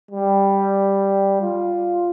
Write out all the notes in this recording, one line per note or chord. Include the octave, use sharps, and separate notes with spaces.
G3
F4